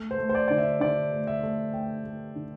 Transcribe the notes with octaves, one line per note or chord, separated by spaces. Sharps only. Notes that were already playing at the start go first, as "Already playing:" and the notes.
Already playing: A3
C5
A3
C5
D5
D3 D5
E5
D3 D5
A3
E5
A3
A3 G5
A3
D3